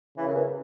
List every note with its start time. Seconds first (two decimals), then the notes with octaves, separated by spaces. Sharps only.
0.17 C#3 E3
0.26 F#2
0.35 E2